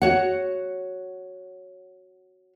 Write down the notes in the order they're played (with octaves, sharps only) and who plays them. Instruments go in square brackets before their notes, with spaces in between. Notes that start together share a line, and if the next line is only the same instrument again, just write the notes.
[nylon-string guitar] F#4 C#5 F#5